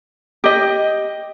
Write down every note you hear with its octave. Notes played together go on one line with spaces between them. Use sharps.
G4 D#5